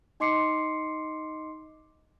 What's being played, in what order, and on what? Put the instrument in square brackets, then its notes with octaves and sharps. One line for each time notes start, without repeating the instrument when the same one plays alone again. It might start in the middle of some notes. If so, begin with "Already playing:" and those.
[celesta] D#4 D#5 C6 D6 C7 C#7